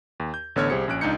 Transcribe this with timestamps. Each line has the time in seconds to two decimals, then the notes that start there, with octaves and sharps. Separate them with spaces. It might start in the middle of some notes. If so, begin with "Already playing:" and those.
0.20 D#2
0.34 G6
0.56 A1 D3 B3 C#5 F6 G#6
0.70 C2 G4 G#4 C5 C#7
0.88 A#1 C#4 F#6 D7
1.01 C#2 D4 D#4 G6 C#7